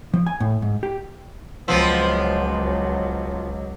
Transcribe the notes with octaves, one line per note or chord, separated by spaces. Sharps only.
F3
G#5
A2
G#2
G4
C#2 F3 F#3 B3 C4